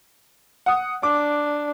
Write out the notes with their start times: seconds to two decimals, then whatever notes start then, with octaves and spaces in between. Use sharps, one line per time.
0.66 F#5 D#6
1.03 D4 D6